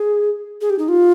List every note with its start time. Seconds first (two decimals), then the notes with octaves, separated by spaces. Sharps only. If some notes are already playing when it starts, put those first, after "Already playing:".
Already playing: G#4
0.61 G#4
0.70 G4
0.79 D#4
0.88 F4